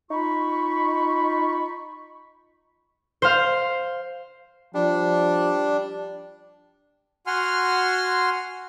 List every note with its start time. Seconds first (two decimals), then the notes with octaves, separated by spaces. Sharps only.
0.10 D#4 F4 B5 C#6
3.22 C5 F5
4.75 F3 G3 D4
7.27 F#4 F#5 G#5 C6 F6